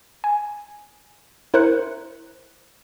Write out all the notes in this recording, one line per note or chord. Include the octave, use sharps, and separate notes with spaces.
G#5
E4 A#4 C5 F#6 C#7